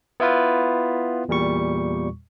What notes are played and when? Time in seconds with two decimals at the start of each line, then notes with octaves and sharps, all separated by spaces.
0.20 B3 E4 F4 B4
1.29 E2 A#2 G3 C#6